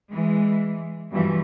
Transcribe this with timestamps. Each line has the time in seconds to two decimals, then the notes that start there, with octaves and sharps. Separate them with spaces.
0.10 E3 G#3
1.11 G2 B2 E3 F3